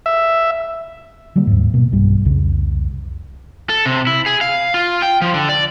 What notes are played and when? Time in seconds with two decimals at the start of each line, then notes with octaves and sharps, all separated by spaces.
0.06 E5
1.36 D3 F#3 G3 A#3
1.47 D#2 G#2
1.74 B2 A#3
1.92 B1 G2 G3
2.25 C2 F2 C#3
3.69 A4
3.86 C3
4.07 E4
4.26 G#4
4.41 F5
4.74 F4
5.02 G5
5.22 F3
5.34 D3
5.49 D5